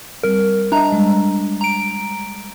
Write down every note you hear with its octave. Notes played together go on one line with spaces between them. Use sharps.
G3 C4 A#4
D4 D#5 E5 A#5
G3 G#3
A#5 D7